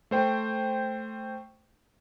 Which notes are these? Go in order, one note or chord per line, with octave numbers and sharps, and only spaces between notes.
A3 C5 G5